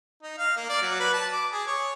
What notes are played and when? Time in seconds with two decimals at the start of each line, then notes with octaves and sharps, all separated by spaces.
0.22 D#4
0.38 F5
0.56 A#3
0.69 D5
0.82 F#3
0.99 B4
1.13 A5
1.33 D6
1.52 G#4
1.67 C#5